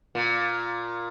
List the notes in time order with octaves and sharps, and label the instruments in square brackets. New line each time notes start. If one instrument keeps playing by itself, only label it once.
[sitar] A#2